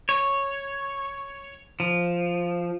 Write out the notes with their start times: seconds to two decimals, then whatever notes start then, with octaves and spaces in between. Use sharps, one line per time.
0.09 C#5
1.80 F3